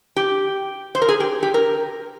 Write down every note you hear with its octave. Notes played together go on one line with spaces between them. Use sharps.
G4
C5
A#4
G#4
G4
G4
A#4